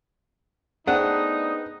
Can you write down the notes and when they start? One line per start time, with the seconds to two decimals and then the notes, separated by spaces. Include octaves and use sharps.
0.87 A3 B3 D4 D#4 G#4 C5 F#5 G5